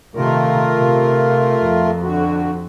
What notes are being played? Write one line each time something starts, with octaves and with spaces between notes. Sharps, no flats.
C3 D#3 A3 F4 A#4
C3
F2
D3 F#4